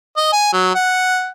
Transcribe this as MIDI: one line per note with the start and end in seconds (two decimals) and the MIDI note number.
0.17 0.32 75
0.33 0.52 80
0.53 0.74 54
0.75 1.28 78